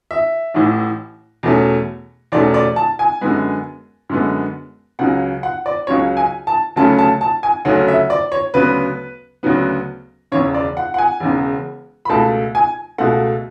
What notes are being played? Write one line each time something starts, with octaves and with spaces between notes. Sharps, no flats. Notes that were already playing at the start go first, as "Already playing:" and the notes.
E5
A1 A2 E3
E2 B2 A3 C#4
E2 B2 A3 C#4 D5
D5
A5
G#5
F#2 D3 G#3 B3
F#2 D3 G#3 B3
C#2 C#3 F#3 C#4 F#5
F#5
D5
C#2 C#3 F#3 C#4 C#5
G#5
A5
D2 C#3 F#3 A3 C#4 A5
A5
A5
G#5
D2 C#3 F#3 A3 C#4 F#5
E5
D5
C#5
D2 C#3 F#3 B3 B4
D2 C#3 F#3 B3
E1 E2 C#3 C#5
D5
F#5
F#5
G#5
E1 E2 C#3
B5
C#2 B2 A3 A5
G#5
C#2 B2 A3 F#5